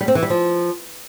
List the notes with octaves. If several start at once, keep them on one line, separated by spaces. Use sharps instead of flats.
G3
C4
E3
G3
F3